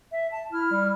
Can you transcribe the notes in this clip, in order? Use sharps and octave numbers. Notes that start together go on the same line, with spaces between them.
E5
A5
E4 F6
G3